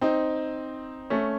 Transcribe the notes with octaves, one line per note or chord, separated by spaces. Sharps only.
C4 D#4
A3 C#4